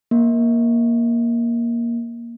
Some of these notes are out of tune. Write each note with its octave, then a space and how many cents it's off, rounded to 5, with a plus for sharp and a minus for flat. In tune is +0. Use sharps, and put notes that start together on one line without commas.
A#3 +10